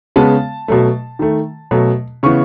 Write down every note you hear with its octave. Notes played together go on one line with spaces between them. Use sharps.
C#3 G#3 B3 A5
B2 F#3 A3
D#3 A3
B2 F#3 A3
C#3 E3 B3 C#6